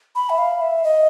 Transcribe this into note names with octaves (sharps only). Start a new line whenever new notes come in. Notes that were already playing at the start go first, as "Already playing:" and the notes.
B5
E5
F5
E5
D#5